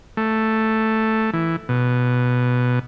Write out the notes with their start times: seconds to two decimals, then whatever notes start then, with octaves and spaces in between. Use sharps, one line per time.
0.17 A3
1.33 E3
1.69 B2